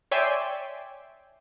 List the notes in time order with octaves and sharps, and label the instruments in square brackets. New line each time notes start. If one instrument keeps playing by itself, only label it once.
[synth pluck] C#5 D5 E5 G5 G#5 C6